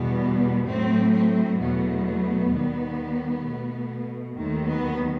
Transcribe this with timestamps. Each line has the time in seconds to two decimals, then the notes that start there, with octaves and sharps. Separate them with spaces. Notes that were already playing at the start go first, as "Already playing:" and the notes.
Already playing: E2 B2 G3 B3
0.65 A2 F#3 A3 C4
1.12 C4
1.58 E2 B2 F#3 A3 B3
2.50 D#2 D#3 G3
3.42 B2 A3
4.35 D#2 D#3 F#3 A3
4.66 B3